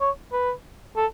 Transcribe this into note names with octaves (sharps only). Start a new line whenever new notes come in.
C#5
B4
A4